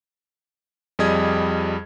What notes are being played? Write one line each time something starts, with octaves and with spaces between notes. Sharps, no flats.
F2 G3 G#4 D#5 D#6 G#6